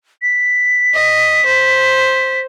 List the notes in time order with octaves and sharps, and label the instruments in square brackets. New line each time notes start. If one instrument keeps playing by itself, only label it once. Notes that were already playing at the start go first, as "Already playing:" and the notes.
[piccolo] B6
[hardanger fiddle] D#5
C5